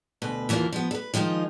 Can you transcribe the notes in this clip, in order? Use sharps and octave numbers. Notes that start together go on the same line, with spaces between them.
D2 B2 B4
D#2 E3 A#3 E4 F4 A#4
F3 B3
A4 B4
D#3 F3 G#3 D#4 F4